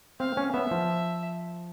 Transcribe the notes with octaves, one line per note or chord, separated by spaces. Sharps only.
C4 F5
C#4
B3 E5
F3